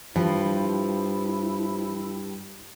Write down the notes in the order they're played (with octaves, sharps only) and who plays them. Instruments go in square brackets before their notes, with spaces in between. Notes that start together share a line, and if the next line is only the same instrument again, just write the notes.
[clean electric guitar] G2 [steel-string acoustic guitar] F3 [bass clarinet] E4